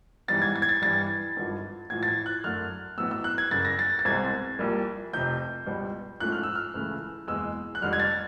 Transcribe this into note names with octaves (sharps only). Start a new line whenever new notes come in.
G#2 E3 G3 B3 A6
G#6
A6
G#6
A6
G2 E3 G3 A6
G#1 G2 D3 F3
A1 A2 F3 G#6
A6
G#6
F#6
F#2 D3 F#3 A3 F6
A1 A2 F#3 B3 E6
E6
F#6
G#6
G1 F#2 C#3 A6
A#6
A6
A6
C2 B2 G#3 C4 G#6
A#1 A#2 G3 A#3
F1 F2 C3 G6
C#2 B2 G3
G#2 F3 A3 C#4 F#6
F6
E6
F6
C#2 C#3 E3 A3
F#1 E2 B2 G#3 E6
F#6
F1 F2 D3 G3 F6
G#6
A6